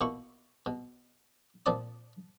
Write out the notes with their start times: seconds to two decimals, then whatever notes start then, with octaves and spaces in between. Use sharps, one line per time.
0.01 B2 A#3 E4 C#6
0.66 B2
1.66 A#2 F3 C4 D5 A5 D#6